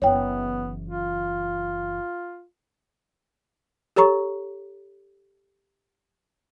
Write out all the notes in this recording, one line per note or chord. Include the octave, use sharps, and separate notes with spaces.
F#1 E3 B3 C#5 G5
F4
G4 A4 C#5 A#5 C#6